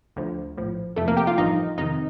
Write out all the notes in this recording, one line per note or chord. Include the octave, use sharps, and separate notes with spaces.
D2 D3 F3
A#1 A2 F3
F2 C3 F3 A3 A4
A#3 A#4
G4 G5
F4 F5
A1 G2 F3 D#4 D#5
F2 C3 D#3 D#4 D#5